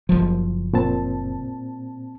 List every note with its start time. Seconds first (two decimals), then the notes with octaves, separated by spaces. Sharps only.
0.09 F#1 F3
0.73 A#2 C4 A5